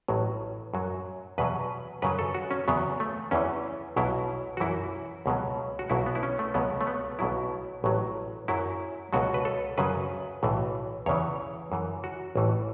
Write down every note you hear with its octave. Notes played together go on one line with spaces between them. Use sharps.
A1 A2 F#3
F#2 F#3
E2 B2 F#3 B4
F#2 C#3 F#3 B4
A4
F#4
C#4
E2 C#3 F#3 B3
A3
E2 E3 C#4
B1 B2 F#3 E4
F#4
F#2 E3 E4
C#2 B2 F#3
F#4
B1 B2 F#3 E4
B3
E4
C#4
A3
C#2 B2 F#3 B3
A3
B3
B1 B2 F#3 E4
A1 A2 F#3
F#2 F#3 E4
C#2 B2 F#3 F#4
B4
A4
F#2 C#3 F#3 B4
B1 A2 E3
E2 C#3 E3 C#5
F#2 E3
F#4
A1 A2 E3